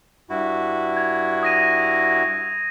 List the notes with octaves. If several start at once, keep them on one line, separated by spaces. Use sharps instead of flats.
G2 E4 F#4
G#6
D#6 A#6 D#7